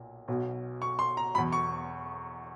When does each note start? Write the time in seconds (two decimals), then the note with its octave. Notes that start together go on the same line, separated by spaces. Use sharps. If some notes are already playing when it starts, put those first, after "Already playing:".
Already playing: B1 A#2
0.28 B1 B2 F#3
0.82 C#6
0.99 C6
1.17 A#5
1.34 E2 B2 F#3 B5
1.52 C#6